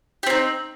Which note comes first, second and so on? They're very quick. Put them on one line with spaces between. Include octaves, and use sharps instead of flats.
G4 C4 D#4